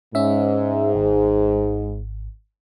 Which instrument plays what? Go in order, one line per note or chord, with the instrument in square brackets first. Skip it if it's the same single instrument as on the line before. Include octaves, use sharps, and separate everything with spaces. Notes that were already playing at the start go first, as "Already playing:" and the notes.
[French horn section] G#2 [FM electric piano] C#4 E5
[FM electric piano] G#1